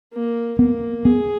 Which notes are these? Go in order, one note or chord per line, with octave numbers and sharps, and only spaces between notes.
A#3
A#3 B3
B3 G#4